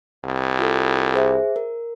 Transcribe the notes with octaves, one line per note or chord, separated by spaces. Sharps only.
C2
F4 A4
G#4 C5 E5
A#4